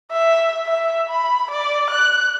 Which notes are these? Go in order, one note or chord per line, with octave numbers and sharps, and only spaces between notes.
E5
E5
B5
D5
F#6